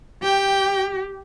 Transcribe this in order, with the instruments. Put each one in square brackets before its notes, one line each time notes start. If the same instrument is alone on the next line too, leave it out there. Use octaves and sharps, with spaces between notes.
[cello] G4 [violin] G5